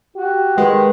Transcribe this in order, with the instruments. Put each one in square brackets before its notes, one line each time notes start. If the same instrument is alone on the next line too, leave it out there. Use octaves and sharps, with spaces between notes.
[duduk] F#4 [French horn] G4
[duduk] D#3 [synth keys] G#3 [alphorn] B4